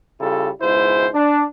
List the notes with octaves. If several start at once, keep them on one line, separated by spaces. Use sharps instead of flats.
C#3 G3 E4 F4 A4
C#2 G#2 B2 E4 C5
D4